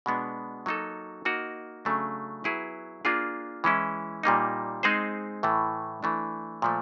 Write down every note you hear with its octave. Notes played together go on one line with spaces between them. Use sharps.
B2 G#3 B3 D4
F#3 A#3 D#4 F#4 A4
A#3 D#4 F#4 A#4 D#5
C#3 F#3 A3 D4
F#3 B3 E4 G#4 B4
A#3 D4 F4 G#4
E3 G#3 C#4 E4
A#2 G3 A#3 D#4
G#3 C4 D#4 G#4 C5
A2 E3 A3
E3 A3 D4
A#2 F3 A3